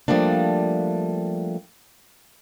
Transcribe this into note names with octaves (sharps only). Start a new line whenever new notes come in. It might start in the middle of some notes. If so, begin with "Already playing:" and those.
F3 G3 A3 A#3 D4